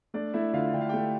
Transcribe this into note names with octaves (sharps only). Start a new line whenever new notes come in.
A3 D4 D5
A3 E4 E5
D3 F4 F5
D3 G5
F5
A3 G4 G5